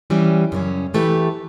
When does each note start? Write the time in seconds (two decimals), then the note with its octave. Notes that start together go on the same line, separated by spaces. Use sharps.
0.10 E3 G3 C#4
0.52 F#2 C#3 G3 C#4
0.94 E3 A3 E4 G4 B4